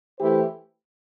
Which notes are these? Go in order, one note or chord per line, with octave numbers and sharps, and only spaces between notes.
E3 A3 E4 G4 C5